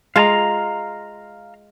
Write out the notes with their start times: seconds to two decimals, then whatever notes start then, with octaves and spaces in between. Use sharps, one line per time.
0.16 G#3 F4 F5 A5 A#5